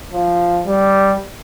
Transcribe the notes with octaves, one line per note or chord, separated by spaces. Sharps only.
F3
G3